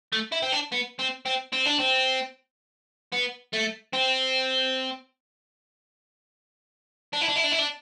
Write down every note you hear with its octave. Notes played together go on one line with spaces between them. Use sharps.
A3
E4
C4
D4
B3
C4
C4
C4
D4
C4
B3
A3
C4
D4
E4
D4
E4
D4
E4
D4